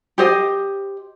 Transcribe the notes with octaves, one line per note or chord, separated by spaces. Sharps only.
G4 C5 D#5